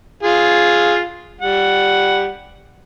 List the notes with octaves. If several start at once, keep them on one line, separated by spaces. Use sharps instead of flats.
F4 G#4 F5
G3 F#5